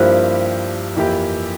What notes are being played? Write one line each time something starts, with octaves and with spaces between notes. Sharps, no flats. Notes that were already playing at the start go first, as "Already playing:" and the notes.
Already playing: G2 F3 A#3 E4 G4 C5
F2 E3 A#3 E4 G4